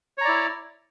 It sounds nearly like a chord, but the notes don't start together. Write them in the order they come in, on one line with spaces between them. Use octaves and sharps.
C#5 A#5 D5 E4